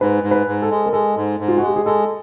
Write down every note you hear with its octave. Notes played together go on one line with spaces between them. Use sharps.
G#2 B4
G#2
B4
G#2
A4
G#3
A#4
G#3 A4
G#2
G#2
F4
G#3 F#4
G4
G#4
G#3 A4